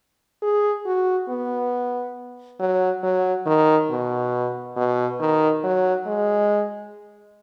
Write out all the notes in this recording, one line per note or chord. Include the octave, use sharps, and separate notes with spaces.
G#4
F#4
B3
F#3
F#3
D#3
B2
B2
D#3
F#3
G#3